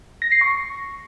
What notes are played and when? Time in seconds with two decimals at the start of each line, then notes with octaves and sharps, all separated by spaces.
0.22 A#6
0.32 C7
0.41 C#6